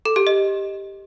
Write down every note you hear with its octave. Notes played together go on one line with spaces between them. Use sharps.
A4
G4
D#5